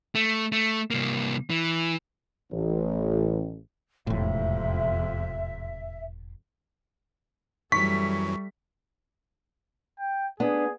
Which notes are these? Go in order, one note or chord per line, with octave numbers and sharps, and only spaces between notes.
A3
A3
C2 A#3
E3
A1
E1 F2 A2 C3 E5
F#2 E3 F#3 G3 A3 C#6 B6
G5
B3 D4 G#4